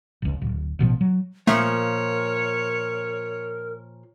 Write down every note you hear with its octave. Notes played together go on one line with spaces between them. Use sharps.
F1 C#2
D1
A1 B2 D#3 F3
F#3
A#2 F3 A3 A#4 C#5